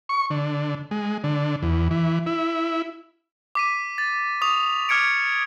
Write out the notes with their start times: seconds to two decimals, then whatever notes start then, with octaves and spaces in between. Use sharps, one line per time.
0.09 C#6
0.30 D3
0.91 G#3
1.24 D3
1.63 E2
1.91 E3
2.26 E4
3.55 D6 B6 D#7
3.98 A6
4.41 C#6 D#6 F7
4.89 D6 F6 G#6 C#7 D7